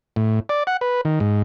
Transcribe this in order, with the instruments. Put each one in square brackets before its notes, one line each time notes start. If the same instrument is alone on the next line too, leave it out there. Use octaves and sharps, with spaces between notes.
[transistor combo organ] A2
D5
F#5
B4
D#3
G#2